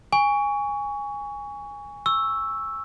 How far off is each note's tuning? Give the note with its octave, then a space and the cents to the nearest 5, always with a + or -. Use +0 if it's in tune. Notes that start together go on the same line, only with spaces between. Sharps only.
G#5 -15 C#6 +25
C#6 +0 E6 +0